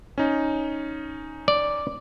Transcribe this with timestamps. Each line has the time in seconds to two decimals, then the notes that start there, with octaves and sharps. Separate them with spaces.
0.18 C#4 D#4
1.48 D5